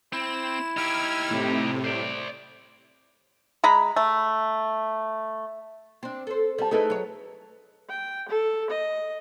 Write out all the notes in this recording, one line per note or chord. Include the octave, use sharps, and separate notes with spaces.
C4 E4 E7
D#4 G4 E6 F6 G#6
A2 C3
C5 D5
G#3 A#5 B5
A3
C4 D4
A4 C5
G3 C5 A5
A3 D#4 E4 G#4 A4 B4
F#3 C#5
G5
A4
D#5